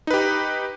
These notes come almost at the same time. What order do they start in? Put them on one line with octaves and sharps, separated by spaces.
D#4 B4 G4